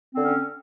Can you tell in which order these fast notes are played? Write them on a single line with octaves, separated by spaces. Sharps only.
C4 D3 C#4